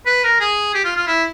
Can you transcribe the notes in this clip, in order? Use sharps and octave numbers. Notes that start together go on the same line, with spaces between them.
B4
A#4
G#4
G4
F4
F4
E4